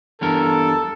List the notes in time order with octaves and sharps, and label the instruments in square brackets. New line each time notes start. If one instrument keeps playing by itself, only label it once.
[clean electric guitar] E2 G2 A#4 [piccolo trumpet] A4